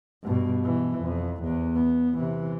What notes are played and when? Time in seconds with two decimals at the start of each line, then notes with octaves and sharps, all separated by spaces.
0.23 G2 B2
0.64 B2 E3
1.02 F2
1.44 E2
1.75 B3
2.18 C3 E3